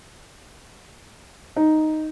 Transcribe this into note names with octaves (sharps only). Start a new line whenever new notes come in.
D#4